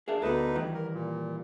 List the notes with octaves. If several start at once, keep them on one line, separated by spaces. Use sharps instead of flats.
D4 G#4 A#4 E5
D2 B3 D#4 A4 B4
D#3 E3 G3
A#4
A#2